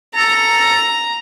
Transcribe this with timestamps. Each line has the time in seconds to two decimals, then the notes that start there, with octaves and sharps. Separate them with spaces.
0.15 A4 A#5